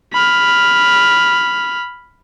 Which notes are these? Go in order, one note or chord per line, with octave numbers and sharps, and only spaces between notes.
B5 F6